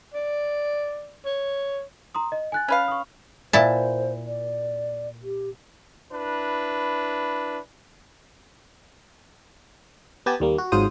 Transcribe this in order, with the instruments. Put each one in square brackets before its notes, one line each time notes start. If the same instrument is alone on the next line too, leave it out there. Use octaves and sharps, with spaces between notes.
[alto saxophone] D5
C#5
[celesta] A#5 C6 D#6
D#5
G#5 F#6 A6
[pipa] C#4 B4 F5
[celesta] C#6 D#6
[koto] A#2 E4 A5 [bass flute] C5
[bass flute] D5
G4
[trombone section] D4 E4 B4
[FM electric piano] B3 G4 G#5 A5
D#2 G3 A#3
F#4
G#1 G#2 F#3 F4 C5 D#6